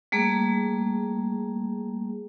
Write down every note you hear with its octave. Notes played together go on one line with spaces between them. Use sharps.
G3 A3 A#3 G#4